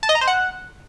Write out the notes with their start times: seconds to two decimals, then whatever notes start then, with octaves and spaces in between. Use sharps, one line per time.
0.03 A5
0.09 D#5
0.15 A#5
0.21 C5
0.27 F#5